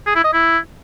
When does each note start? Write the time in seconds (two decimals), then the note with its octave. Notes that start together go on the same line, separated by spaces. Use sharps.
0.06 G#4
0.15 E4
0.24 D#5
0.33 E4